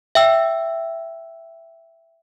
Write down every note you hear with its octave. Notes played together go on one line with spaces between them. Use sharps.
E5 G5 E6